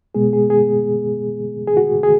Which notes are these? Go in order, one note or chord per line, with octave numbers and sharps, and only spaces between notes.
B2 G#3 B3 G#4
G#4
G#4
G#4
F#4
G#4